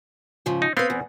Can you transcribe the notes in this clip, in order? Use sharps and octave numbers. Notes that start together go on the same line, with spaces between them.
G#2 C#3 F3
D#4
B3 C4 B4 F5
E2